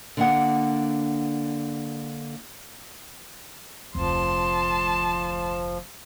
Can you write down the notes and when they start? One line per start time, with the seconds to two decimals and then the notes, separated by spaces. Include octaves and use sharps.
0.17 D3 A#3 F#5
3.95 F1 D2 F3 A5 C6